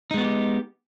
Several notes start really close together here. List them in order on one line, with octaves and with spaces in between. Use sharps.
D#4 G#3 B3 F#4 G4